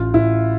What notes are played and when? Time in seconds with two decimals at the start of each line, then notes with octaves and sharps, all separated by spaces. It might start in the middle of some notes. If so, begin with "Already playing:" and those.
Already playing: A1 F4
0.14 A1 E4